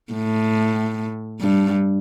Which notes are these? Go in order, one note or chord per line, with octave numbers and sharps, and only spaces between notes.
A2
G2